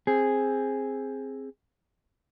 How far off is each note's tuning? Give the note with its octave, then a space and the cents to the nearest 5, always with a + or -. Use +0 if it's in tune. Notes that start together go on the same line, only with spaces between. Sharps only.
C4 +10 G#4 +0